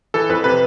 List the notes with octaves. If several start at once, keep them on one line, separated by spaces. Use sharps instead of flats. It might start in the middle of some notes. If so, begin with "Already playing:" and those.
E3 A4
F2 B4
C3 B4